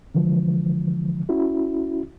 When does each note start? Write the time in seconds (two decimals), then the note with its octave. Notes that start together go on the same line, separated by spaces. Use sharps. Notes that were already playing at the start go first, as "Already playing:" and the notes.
0.15 D3 E3 F3 G#3
1.29 C#4 E4 F#4